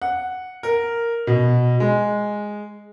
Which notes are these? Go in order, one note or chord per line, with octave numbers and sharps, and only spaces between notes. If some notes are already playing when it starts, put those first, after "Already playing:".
F#5
A#4
B2
G#3